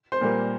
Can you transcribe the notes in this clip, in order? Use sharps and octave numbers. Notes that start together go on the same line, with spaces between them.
C5 C6
A#2 G3 A#3